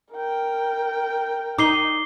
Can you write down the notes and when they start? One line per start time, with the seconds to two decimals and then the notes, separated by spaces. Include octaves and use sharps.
0.13 A#4 G5
1.59 D#4 D6 C7 G7